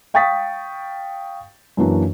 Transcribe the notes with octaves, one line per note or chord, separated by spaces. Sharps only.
F5 G5 C#6 D#6 A6 B6
F#2 E3 A#3 D4 F#4